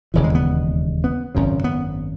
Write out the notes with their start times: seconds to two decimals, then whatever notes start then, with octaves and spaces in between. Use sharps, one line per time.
0.14 E1 D#2 C#3 E3
0.24 G#3
0.35 B3
1.04 B3
1.35 G#1 F#2 C#3
1.64 B3